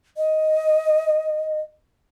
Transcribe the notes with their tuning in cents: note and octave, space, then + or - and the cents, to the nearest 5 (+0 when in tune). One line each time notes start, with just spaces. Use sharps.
D#5 +10